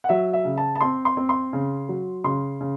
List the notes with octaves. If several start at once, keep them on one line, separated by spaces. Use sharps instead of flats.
F#5
F#3 E5
E5
C#3
A5
A5
C4 C6
C6
C4
C6
C#3
F#3
C#3 C6
C#3